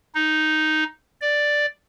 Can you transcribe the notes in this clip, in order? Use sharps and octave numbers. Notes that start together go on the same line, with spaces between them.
D#4
D5